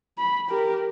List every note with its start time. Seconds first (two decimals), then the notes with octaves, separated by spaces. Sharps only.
0.18 B5
0.49 G4 A#4